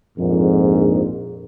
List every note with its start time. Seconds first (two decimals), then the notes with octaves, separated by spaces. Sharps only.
0.18 A#1 F2 G#2